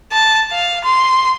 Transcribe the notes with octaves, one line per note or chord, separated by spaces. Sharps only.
A5
F5
C6